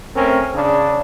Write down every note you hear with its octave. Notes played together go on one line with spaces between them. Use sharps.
A3 C4 C#4 A#4
C#3 D4